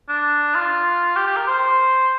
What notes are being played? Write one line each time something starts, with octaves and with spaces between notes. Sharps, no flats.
D4
F4
G4
G4
A#4
C5